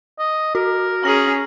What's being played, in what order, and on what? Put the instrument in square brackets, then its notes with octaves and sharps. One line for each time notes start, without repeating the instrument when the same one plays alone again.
[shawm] D#5
[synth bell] F#4 [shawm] A#4
[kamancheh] C#4 G#4 [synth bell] A#5 A#6 F#7